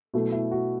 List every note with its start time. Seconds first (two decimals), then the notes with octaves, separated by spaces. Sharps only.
0.14 B2 F#3 A3 E4
0.32 E4
0.51 F#4